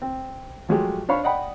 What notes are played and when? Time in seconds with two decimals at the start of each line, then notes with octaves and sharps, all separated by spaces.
0.02 C4
0.69 F3 F#3 G#3 A3 F#4 G4
1.09 D4 C5 C#5 F5 B5 C#6
1.24 D5 D#5 F#5 G5 B5